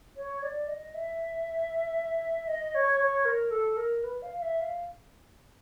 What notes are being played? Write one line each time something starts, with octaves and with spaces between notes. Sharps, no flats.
C#5
D5
D#5
E5
D#5
C#5
C#5
A#4
A4
A#4
B4
F5
F5
E5
F5